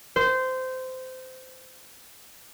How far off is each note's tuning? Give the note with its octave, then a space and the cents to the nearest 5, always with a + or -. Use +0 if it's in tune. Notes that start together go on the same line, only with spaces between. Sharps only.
C5 -20